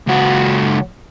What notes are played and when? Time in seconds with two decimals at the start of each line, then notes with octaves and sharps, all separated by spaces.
0.07 C#2 F#4